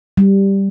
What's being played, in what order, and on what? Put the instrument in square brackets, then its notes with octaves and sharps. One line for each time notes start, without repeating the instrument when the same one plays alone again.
[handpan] G3